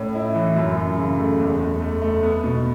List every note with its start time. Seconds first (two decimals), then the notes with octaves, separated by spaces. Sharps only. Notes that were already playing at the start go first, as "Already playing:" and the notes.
Already playing: A2 C#4
0.15 E4
0.35 E3
0.56 F#2
0.77 F#2
0.98 C#3
1.19 A3
1.40 E2
1.60 E2
1.81 A3
2.02 A3
2.23 B3
2.44 B2